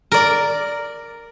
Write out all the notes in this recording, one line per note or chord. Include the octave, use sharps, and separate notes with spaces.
A#4 D5